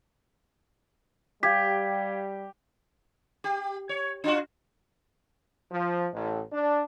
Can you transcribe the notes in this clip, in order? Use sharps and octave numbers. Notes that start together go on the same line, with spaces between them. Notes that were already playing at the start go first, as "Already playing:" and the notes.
G3 G4 F5 G#6 B6
G4
C#5
D4 F4 F#4
F3
A1
D4